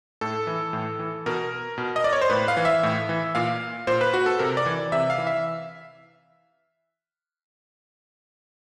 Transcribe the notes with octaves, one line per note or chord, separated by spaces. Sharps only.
A2 A4
E3
A2
E3
B2 A#4
B2
D#5
D5
C#5
C5
A2 B4
F5
E3
E5
A2
E3
A#2 F5
A#2 C5
B4
F#4
A4
C3 A#4
D5
E3
C3 E5
F5
E3
E5